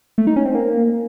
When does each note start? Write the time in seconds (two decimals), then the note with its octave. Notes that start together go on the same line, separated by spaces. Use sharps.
0.18 A3
0.27 D#4
0.36 C#4
0.45 C4
0.55 A#3